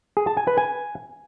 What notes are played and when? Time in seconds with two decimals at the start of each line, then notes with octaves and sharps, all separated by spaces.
0.17 G#4
0.27 A5
0.37 G#5
0.47 B4
0.58 G#5